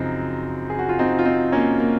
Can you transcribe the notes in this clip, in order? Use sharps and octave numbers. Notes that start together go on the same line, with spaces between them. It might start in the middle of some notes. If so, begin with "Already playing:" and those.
Already playing: F#2 C#3 F3 C4 D#4
G#4
F#4
F4
C4 D#4
F4
C4 D#4
A#3 C#4
A#3